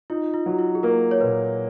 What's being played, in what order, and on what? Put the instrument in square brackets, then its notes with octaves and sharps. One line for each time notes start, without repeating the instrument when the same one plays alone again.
[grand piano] D#4 [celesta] F4
[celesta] F4
[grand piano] F#3
[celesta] F4
G#4
[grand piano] A#3 [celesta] A#4
[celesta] C#5
[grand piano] A#2 [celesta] B4